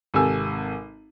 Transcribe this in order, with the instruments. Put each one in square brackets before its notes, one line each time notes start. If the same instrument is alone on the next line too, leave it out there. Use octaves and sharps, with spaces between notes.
[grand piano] G#1 C3 A4 G#5 E6